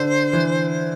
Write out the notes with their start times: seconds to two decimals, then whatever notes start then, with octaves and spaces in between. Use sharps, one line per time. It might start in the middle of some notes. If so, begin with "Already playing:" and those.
Already playing: D3 C5
0.33 E3